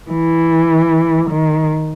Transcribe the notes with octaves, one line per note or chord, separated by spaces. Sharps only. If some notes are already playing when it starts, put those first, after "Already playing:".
E3
D#3